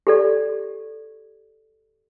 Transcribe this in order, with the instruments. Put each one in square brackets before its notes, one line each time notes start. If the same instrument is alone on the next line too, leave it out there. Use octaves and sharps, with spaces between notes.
[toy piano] G4 A4 D5